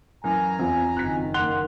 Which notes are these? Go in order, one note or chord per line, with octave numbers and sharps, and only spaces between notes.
F#2 E3 G#5 A#5
E2 C4 F4
F#1 D#3 F#6 B6
A#3 F#5 C6 F#6 F7 G7